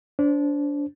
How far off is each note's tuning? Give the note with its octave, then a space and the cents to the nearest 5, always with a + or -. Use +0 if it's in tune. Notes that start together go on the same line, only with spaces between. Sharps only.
D4 -25 C5 +0